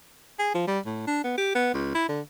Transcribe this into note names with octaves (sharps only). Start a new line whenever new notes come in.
G#4
F3
G3
A2
D4
B3
G4
B3
C#2
E4
D3